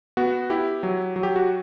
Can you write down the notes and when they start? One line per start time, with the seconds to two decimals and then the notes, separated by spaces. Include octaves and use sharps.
0.17 B3 F#4
0.50 E4 G4
0.83 F#3
1.16 F#3
1.23 G4
1.36 F#4